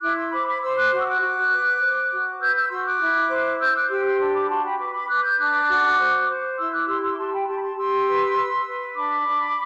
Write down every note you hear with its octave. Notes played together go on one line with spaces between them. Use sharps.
E4 D6 F#6
C6 E6
C5 B5 D6
B5 D6
C5 C6 E6
D6 F#6
F#4
E6
D6 F#6
F#4
B4
C5
F#4
B4 E6 G6
E6 G6
F#4 C6 E6
D6 F#6
E4
C5
C5 E6 G6
D6 F#6
G4 C6 E6
C6 E6
D4 C6 E6
B5 D6
F#4 A5 C6
G5 B5
B4 B5 D6
C6
B5 D6
B4 D6 F#6
E6 G6
D4 D6 F#6
F#4
C5
C5
E4 C6 E6
D6 F#6
G4 C6 E6
C6 E6
D6
G4 A5 C6
G5 B5
G4 A5 C6
B5
A5 C6
G4 C6 E6
B4
B4
B4
D4 B5 D6
D4